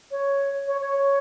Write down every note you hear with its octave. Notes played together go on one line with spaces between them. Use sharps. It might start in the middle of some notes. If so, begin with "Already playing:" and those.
C#5
C#5
C#5